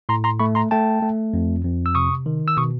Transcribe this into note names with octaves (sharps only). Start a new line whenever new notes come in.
A2 A#5 C6
A#5 C6
A3 B5 C#6
A#5 C6
A3 G5 A5
A3
F2
F2
E6
C3 C#6 D#6
D#3
E6
B2 C#6 D#6